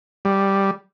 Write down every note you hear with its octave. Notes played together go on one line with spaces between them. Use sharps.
G3